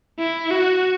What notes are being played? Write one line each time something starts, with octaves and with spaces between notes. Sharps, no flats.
E4
F#4